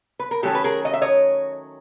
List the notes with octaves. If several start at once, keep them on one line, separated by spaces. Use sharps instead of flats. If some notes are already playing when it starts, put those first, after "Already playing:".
B4
A#4
D#3 F#3 A3 C#4 G4 A4
B4
G#4 A#4
D#5
E5
C#5 D#5